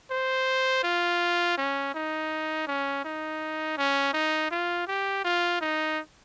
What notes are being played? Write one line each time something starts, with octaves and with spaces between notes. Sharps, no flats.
C5
F4
C#4
D#4
C#4
D#4
C#4
D#4
F4
G4
F4
D#4